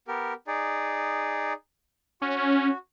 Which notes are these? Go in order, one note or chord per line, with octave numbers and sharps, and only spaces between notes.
B3 G4 A#4
D#4 G#4 D5
C#4 F#4